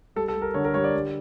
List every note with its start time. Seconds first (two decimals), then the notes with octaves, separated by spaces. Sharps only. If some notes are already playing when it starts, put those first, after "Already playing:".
0.16 G3 A4
0.28 A4
0.35 G3
0.42 A#4
0.54 D3 C#5
0.64 A#4
0.74 G3 C#5
0.84 D5
0.94 G3